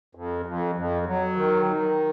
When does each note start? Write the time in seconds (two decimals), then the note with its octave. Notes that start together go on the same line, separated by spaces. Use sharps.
0.15 F2
0.46 F2
0.76 F2
1.06 F#3
1.36 D#3
1.66 D#3